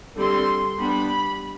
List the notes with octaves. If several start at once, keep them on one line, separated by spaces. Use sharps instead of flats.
D3 G3 C4 C6
G3 B3 D4 B5